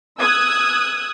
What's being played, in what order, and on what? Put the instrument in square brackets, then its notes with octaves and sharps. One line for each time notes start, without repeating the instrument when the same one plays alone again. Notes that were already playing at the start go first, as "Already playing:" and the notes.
[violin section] D#6 E6 F#6 G#6